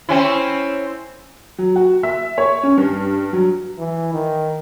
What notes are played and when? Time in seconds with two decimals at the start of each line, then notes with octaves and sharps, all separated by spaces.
0.09 C4 C#4 E4
1.58 F#3
1.76 F#4
2.03 E5
2.38 C#5
2.63 C#4
2.77 G2
3.33 F#3
3.78 E3
4.13 D#3